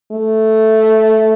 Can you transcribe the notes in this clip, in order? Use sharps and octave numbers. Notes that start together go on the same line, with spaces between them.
A3